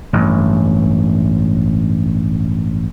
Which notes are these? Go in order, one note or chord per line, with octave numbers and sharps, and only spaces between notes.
A1 G2